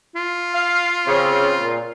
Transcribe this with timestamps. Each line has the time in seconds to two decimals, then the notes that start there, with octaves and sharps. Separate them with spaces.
0.16 F4
0.54 F5
1.07 C#3 C4
1.61 A#2